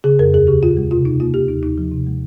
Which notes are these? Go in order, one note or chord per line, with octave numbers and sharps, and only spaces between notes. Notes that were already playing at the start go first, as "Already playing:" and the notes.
C#3 G#4
F2 A#4
D#2 G#4
C#3 G4
A#2 F4
G#3
C3 F4
C3 D#4
A#3 F4
A#3 G4
D#2 D#4
D#2 D#4
F3
C3
G#3